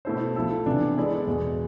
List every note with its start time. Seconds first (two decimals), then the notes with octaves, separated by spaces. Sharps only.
0.05 B2 A3 E4 A4 C5
0.36 F3 A3 E4 A4
0.66 C3 E3 B3 D4
0.97 G#3 B3 E4 A4 D5
1.27 E2 B2 G#3